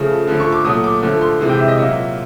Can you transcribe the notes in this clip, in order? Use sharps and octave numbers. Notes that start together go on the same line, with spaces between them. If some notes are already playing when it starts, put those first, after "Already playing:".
Already playing: C#3 F3 A3
D3 F3 A3
C#6
D6
A#2 F#3 A3 D#6
D6
D3 F3 A3
C6
C3 E3 G#3
G5
E5
D#5
A#2 F#3 A#3 E5